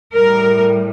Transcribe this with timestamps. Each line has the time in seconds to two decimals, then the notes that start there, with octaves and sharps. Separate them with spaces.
0.15 A2 G3 A#4